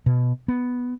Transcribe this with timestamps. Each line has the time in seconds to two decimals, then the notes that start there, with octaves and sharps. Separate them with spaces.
0.06 B2
0.48 B3